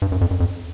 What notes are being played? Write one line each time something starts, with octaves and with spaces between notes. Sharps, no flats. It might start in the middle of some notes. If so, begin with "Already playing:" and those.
G2
F#2
F2
F#2
F2